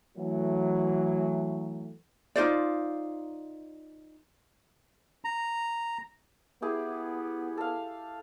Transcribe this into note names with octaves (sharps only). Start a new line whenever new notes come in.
E3 F#3 A3
D#4 F4 C5 D5
A#5
B3 E4 G4 G#4
A4 F5